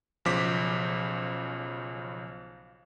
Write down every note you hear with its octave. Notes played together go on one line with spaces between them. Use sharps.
B1 C#3 F3 C5 D6 B6